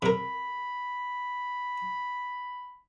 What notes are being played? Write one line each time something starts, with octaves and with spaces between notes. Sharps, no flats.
C3 A#4 B5